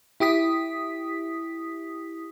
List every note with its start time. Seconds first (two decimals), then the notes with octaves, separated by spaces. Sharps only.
0.20 E4 G4 D#6 B6